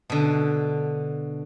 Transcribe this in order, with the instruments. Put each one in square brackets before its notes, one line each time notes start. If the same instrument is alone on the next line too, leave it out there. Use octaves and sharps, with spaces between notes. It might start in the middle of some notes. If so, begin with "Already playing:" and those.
[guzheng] B2 D3